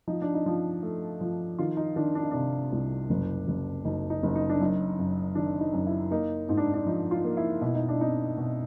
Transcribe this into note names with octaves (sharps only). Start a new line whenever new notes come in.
F3 D#4
D4
D#4
F3
A3
F3
D#3 F4
D#4
D#3 D4
D4
D#4
C3 D4
C2
F#1
F#1
F#1 D#4
D#4
F#1
D#4
D4
F#2 D#4
F#2
D#3 D4
D#4
F#2
E4
A#3 D#4
G#2 D#4
D4
D4
F3 D#4
F4
A#3
E4
B2 E4
D#4
D4
C4 D#4
B2